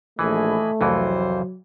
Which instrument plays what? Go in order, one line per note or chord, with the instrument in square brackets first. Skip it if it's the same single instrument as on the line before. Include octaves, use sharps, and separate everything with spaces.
[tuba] A#1 [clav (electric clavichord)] E3 [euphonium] A3 [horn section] D#5 G#5 B5
[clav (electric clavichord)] C2 F2 E3 [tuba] F#3 [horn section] C5